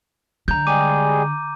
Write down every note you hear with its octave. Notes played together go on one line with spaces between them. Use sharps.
D3 A#5 G6
G3 G#3 G#4 D6 D#7